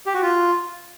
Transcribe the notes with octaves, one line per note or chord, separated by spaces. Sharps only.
G4
F#4
F4